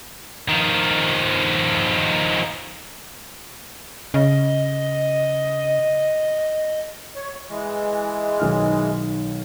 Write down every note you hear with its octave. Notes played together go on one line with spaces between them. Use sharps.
D#3 F3
C#3 D#5
C#5
E3 G#3
B1 D#3 F6